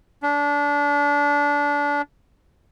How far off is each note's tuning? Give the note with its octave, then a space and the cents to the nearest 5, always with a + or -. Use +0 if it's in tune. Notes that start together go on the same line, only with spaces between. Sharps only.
D4 -25